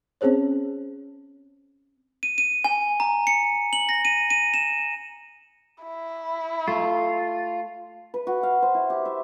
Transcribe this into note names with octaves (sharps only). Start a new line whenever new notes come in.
C4 C#4 G#4 C5 C#5
D#7
D#7
G#5
A#5
C#7
F#7
A#6
D#7
D#7
E7
E4
A3 F4
B4
F#4
F5
C5
E4
G4
E5